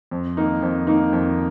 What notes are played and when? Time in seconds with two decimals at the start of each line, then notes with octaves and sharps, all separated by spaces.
0.11 F2
0.37 D#3 A#3 D#4
0.62 F2
0.87 D#3 A#3 D#4
1.13 F2